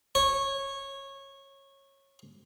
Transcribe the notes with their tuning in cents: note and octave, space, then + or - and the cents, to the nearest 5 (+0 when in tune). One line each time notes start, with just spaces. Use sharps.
C#5 -15